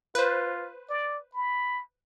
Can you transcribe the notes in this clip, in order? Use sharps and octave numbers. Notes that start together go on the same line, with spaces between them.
F4 B4 C5
D5
B5